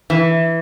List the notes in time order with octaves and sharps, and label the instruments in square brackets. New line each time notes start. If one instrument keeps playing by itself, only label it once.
[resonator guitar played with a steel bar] E3